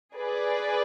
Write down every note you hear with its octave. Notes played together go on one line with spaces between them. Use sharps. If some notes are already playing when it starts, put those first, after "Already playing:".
G#4 B4 D5